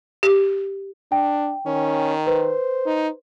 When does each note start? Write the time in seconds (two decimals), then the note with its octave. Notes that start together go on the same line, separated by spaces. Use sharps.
0.23 G4
1.12 D4 G5
1.66 D#3 C#4
2.27 B4 C5
2.86 D#4